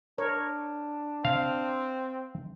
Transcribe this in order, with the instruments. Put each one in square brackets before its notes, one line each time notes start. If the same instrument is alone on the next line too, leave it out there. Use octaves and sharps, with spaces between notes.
[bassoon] D4 [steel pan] A#4 C#5
[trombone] C4 [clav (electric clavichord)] F5